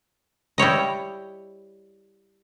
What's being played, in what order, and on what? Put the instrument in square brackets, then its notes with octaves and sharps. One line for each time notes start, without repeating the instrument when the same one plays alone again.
[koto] G3 E4 C#5 D#5